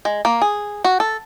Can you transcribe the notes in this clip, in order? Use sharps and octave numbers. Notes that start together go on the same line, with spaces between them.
G#3
A#3
G#4
F#4
A4